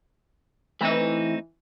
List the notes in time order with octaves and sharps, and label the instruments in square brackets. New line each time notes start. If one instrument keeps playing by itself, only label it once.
[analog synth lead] E3 [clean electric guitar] A3 C4 D#4